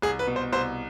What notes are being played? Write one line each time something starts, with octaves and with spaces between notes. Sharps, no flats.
C2 G#4
B4
B2
C5
C2 C5